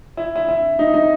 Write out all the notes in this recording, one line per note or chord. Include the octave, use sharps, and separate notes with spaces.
E4
E4
E4
D#4
D#4